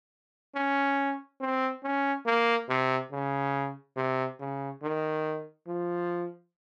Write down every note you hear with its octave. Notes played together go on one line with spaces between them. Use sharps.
C#4
C4
C#4
A#3
C3
C#3
C3
C#3
D#3
F3